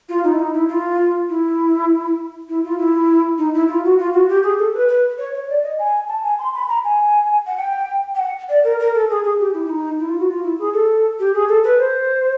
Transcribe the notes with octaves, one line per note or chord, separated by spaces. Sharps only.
F4
D#4
E4
D#4
E4
F4
E4
E4
F4
E4
D#4
E4
F4
F#4
F4
F#4
G4
G#4
A4
B4
B4
C#5
C#5
D5
D#5
G#5
A5
G#5
C6
B5
A#5
G#5
F#5
G5
G5
F#5
D5
A#4
A#4
A4
G#4
G#4
G4
E4
E4
D#4
E4
F4
F#4
F4
E4
G#4
A4
G4
G#4
A4
B4
C5